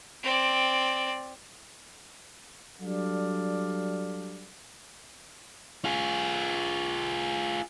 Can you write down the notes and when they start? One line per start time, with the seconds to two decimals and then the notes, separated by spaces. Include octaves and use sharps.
0.24 C4 D5
2.80 F#3 G3 D4 A4 D5 F5
5.85 F4 G#4